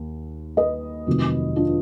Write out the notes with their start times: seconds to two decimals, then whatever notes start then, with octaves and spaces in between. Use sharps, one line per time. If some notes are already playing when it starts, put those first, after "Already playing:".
Already playing: D#2
0.57 B4 D#5
1.07 F1 F2 D#3 F#3
1.56 D4 F4